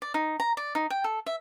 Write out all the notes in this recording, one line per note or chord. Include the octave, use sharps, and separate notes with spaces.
D5
D#4
A#5
D5
D#4
G5
A4
E5